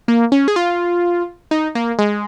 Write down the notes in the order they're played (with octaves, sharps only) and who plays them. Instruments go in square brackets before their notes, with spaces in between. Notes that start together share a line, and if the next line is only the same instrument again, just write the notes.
[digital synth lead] A#3
C#4
G#4
F4
D#4
A#3
G#3